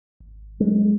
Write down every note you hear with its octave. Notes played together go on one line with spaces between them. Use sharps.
G#1
F#3 G#3